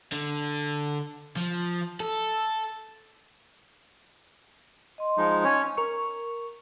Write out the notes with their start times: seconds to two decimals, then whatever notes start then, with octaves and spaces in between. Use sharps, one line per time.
0.12 D3
1.36 F3
2.00 A4
4.98 D#5 C6
5.18 F3 G#3 D#4
5.44 C#4 C#5
5.77 A#4 C#6